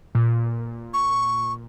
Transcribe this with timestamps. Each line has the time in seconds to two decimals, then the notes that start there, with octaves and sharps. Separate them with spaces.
0.15 A#2
0.94 C#6